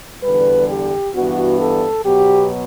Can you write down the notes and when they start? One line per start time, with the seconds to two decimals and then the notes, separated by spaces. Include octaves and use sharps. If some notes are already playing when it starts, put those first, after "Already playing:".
0.22 E2 D3 G3 B4
0.68 G4
1.14 G2 E3 B3 D4 F#4
1.59 A4
2.05 B2 F#3 B3 G4